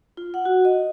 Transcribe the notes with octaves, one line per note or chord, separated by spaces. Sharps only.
F4
F#5
F#4
D#5